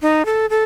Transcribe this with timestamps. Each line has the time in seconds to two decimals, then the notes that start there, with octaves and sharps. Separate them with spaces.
0.02 D#4
0.26 A4
0.50 A4